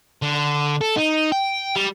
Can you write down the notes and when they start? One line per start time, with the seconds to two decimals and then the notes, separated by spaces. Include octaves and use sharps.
0.22 D3
0.81 A4
0.96 D#4
1.32 G5
1.76 G3